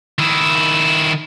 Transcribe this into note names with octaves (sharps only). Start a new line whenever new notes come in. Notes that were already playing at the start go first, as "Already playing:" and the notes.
D#3 E4